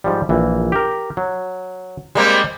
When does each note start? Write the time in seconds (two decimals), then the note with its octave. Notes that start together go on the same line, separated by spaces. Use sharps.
0.04 G#2 F3 G3
0.29 A#1 E3
0.72 G4 A#4
1.17 F#3
2.15 G3 G#3 A#3 C4 D#5